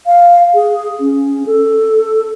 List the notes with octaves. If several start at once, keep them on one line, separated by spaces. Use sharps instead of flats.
F5
G#4
C#4
A4